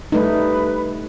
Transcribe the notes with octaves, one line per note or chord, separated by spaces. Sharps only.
G3 A3 D#4 B4